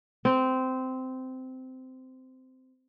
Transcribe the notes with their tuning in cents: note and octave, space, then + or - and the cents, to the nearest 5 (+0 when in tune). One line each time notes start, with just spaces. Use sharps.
C4 -15